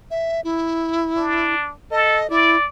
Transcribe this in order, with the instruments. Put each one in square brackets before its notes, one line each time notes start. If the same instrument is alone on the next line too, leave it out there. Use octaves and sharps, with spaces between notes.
[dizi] E5
E4
[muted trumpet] D4
[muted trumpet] A4 [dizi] D#5
[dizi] E4 [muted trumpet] D5